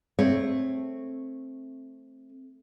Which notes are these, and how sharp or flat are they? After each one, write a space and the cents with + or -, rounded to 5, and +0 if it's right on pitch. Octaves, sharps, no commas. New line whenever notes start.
A3 +0 C4 +10 C#5 -5